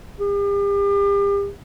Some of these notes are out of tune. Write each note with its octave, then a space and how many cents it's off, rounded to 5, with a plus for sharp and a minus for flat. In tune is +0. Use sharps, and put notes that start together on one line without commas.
G4 +40